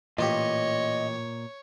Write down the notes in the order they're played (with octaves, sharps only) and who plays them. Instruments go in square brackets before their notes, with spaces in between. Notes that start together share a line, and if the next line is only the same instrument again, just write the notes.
[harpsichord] A1 F4 G4 [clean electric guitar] A#2 [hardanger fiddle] C#5 [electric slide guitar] D#5